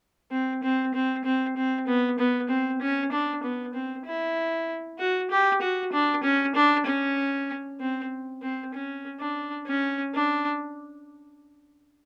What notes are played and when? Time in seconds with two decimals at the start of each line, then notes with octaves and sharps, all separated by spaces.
0.31 C4
0.63 C4
0.94 C4
1.24 C4
1.56 C4
1.87 B3
2.19 B3
2.49 C4
2.81 C#4
3.12 D4
3.43 B3
3.74 C4
4.05 E4
4.99 F#4
5.30 G4
5.61 F#4
5.93 D4
6.23 C#4
6.55 D4
6.86 C#4
7.80 C4
8.42 C4
8.74 C#4
9.20 D4
9.67 C#4
10.14 D4